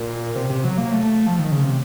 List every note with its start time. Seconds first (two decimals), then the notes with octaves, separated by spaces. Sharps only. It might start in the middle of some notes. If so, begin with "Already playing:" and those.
Already playing: A#2
0.35 C3
0.50 C3
0.64 F#3
0.78 A#3
0.92 A3
1.27 F3
1.39 D#3
1.51 C#3
1.63 C3